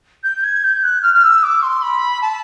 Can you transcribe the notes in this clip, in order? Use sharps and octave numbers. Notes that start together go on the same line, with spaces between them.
G6
G#6
G6
F#6
F6
F6
E6
D6
C6
B5
A5